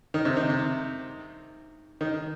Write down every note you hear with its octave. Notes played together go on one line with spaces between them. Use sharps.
D#3
C3
D#3
C3
D#3